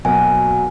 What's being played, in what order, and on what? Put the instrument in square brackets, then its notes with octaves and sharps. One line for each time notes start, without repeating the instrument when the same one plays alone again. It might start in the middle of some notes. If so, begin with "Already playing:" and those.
[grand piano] B2 F#3 A#3 [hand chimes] G#5